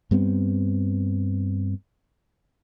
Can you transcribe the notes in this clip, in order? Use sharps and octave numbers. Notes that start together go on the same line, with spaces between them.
G2 G3 B3 C4